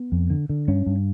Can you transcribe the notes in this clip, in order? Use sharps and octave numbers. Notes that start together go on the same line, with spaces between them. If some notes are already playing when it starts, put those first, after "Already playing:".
Already playing: B3
F2
D3
D3
G2 C#4
G2